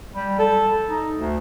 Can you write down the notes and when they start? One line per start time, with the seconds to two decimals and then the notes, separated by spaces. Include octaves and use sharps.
0.14 G3
0.39 A4
0.89 D#4
1.16 D2